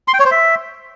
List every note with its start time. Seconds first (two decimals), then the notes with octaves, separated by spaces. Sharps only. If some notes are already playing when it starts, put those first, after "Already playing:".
0.08 C6
0.14 G5
0.19 C#5
0.25 C5
0.31 E5